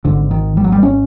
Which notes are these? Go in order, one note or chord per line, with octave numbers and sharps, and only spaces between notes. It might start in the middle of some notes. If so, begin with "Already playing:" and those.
G#1 G#2 D3
D#3
G3
F#3
G3
C#4